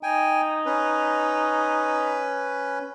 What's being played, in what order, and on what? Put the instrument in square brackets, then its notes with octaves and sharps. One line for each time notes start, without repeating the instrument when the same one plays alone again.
[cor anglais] D#4 [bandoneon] G5 G#5
[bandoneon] C#4 B4